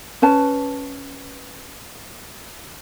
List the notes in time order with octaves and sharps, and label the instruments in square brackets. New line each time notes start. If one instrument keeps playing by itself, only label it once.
[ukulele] C#4 B4 A5